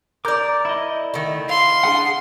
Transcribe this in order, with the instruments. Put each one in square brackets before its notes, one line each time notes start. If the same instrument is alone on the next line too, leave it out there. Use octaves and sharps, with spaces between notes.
[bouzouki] A#4 D5 [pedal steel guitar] D6 G6
[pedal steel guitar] E4 D#5
[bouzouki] D#3 A3
[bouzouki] F5 [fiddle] C6
[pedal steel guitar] D4 G#4 F#5